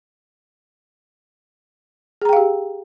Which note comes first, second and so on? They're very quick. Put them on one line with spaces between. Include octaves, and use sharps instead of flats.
G#4 A#5 G5 F5 G4